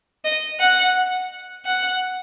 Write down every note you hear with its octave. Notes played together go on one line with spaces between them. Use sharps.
D#5
F#5
F#5